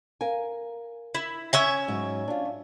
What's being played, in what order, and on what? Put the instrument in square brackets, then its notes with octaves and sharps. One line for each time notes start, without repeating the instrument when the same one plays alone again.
[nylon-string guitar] A#4 F5 G#5
[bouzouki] E4
C#4 E5 G#5
[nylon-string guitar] G#2 F#3
D4 F4